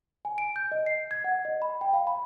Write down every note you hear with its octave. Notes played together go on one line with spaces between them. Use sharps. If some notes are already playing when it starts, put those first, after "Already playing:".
G#5
D7
G6
D#5
C7
G#6
F#5
D#5
B5
G5
F5
B5